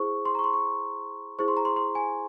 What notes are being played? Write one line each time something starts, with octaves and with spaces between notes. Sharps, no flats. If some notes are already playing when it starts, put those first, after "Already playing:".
Already playing: E4 G#4 C5 C#6
C6
A#5
C#6
C6
C#6
E4 G#4 C5 C#6
C6
A#5
C6
C6
G#5